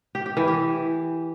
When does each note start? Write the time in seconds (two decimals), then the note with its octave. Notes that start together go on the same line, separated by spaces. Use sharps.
0.15 G4
0.26 G4
0.37 E3
0.48 G4